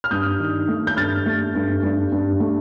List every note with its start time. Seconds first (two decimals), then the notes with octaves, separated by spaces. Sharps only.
0.04 F6
0.11 G2 D#6 G6
0.40 D#3
0.68 A3
0.87 G6
0.97 G2 F6 A6
1.26 A3
1.55 G2
1.83 G2
2.12 G2
2.40 A3